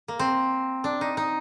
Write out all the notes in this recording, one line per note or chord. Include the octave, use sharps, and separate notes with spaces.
A#3
C4
D4
D#4
D#4